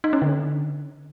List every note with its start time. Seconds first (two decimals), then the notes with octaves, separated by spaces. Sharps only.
0.04 D#4
0.13 C#4
0.22 D3